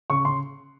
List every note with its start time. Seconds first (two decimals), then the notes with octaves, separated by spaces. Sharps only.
0.10 C#3 C#6
0.25 C#3 C6